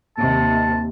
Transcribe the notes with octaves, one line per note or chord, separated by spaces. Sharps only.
D#2 C3 A5